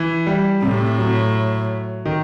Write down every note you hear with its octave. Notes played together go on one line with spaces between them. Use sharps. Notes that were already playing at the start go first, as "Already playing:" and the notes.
Already playing: E3
G3
A2 C3
F#3
D#3